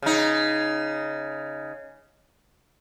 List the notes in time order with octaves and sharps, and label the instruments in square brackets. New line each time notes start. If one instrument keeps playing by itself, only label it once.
[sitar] C#3 D#4